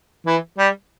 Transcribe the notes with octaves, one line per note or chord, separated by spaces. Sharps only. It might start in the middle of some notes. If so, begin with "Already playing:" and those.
E3
G3